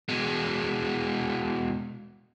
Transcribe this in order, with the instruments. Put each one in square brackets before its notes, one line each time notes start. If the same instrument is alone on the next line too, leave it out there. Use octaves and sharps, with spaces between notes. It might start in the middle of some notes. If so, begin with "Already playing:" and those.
[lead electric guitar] B2 G#3